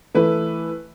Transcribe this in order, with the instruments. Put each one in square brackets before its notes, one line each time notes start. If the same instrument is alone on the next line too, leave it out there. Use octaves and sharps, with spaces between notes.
[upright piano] E3 A3 E4 B4